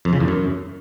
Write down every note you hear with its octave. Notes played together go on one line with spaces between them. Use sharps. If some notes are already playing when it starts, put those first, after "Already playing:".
F2
C#3
E2
F#2